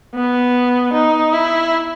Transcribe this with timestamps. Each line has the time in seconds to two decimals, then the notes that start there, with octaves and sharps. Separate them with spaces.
0.15 B3
0.93 D#4
1.33 E4